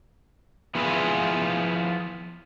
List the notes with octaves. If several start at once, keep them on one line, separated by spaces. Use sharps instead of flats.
F3 B3 E4 F4 G#4 B4